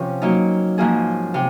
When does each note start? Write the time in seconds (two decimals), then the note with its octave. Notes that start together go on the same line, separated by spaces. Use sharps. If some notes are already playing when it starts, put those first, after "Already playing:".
Already playing: C3 F3 C#4 F4
0.22 F#3 A#3 D#4
0.78 G#2 F3 A#3 C#4 G#4
1.34 C3